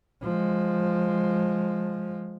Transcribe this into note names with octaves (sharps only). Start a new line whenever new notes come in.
F3 G#3